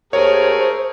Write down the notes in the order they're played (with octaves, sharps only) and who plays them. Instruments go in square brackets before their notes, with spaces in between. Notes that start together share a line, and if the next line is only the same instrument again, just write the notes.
[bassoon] D#2 [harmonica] A3 G#4 A#4 [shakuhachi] C5 [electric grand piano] C#5